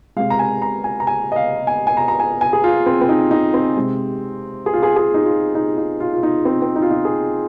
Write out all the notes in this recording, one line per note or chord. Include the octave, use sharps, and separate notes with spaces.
C3 G#3 F5
A#5
G#5
A#5
G#5
A#5
G#5
D#5
F5
G#5
G#5
A#5
A#5
G#5
G#5
G#4
F4
C4
C4
D#4
D#4
C4
C3 G#3
G#4
F4
G#4
G#4
D#4
F4
D#4
D#4
F4
F4
D#4
C4
C4
D#4
F4
D#4
G#4